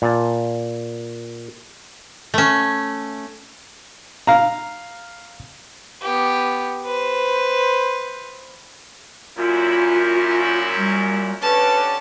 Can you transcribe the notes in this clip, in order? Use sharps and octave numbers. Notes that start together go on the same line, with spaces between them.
A#2 A5
A3 C#4
F5 A#5
B3 G4
B4 C5
F#2 A#2 E4 F4
G3
D3 C#4 G4 B4 A5